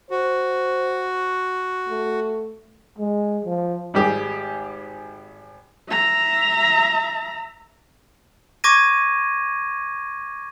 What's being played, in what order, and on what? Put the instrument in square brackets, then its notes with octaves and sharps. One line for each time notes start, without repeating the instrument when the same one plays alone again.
[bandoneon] F#4 [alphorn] C5
[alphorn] A3
[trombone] G#3
F3
[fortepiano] G#1 G3 G4 G#4
[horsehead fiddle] E5 A#5
[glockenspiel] C#6 D6 G#6 A#6 D#7